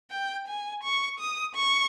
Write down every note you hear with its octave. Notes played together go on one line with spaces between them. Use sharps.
G5
G#5
C#6
D#6
C#6